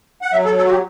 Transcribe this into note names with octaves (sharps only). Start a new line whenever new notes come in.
F#5
F#3 E5
A4
F#3
A4
F#4
G4